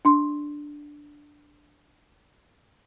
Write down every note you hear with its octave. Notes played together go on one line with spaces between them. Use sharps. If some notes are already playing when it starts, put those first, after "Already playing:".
D4 C6